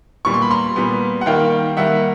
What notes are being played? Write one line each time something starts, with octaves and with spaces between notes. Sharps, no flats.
A#2 G3 B3 C#6
C6
B5
A#5 C6
A#2 G3 B3
F#5
D#3 G3 A#3 F5 G5
D#3 G3 A#3 E5 F#5